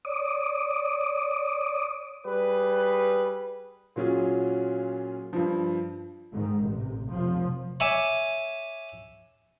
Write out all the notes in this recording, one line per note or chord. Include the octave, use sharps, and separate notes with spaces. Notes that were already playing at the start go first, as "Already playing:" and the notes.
C#5 D5 D6 D#6
G3 G#4 B4
A#2 F#3 C#4 F4 G#4
G2 F3
G#2 D#3
A1 C3
F1 F3
C#5 E5 G#5 D6